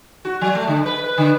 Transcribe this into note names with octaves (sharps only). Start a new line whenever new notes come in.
F#4
F#3
A3
D3
B4
B4
D3